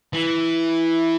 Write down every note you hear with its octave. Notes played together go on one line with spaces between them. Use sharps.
E3